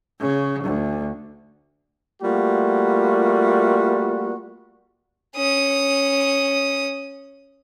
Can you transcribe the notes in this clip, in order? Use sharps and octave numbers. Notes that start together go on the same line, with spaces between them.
C#3
D2
G3 A3 A#3 F4 F#4
C#4 D#6